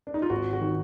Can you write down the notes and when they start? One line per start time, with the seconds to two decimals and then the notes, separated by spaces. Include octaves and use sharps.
0.07 D4
0.14 D#4
0.22 F4
0.30 G#1 F#4
0.53 F#4
0.61 D#3